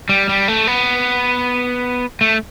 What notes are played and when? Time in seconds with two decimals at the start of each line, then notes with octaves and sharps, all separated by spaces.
0.09 G3
0.29 G3
0.48 A3
0.67 B3
2.21 A3